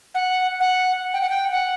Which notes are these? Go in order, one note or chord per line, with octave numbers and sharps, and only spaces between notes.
F#5
F#5
G5
F#5
G5
F#5